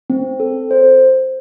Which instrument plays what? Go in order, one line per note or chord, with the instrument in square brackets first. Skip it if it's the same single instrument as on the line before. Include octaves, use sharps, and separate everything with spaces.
[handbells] C4
A4
C5